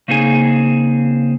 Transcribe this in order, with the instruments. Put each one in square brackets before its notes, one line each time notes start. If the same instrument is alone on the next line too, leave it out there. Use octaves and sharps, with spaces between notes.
[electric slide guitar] C#3 A#3 C4 D#4 G#4 G#5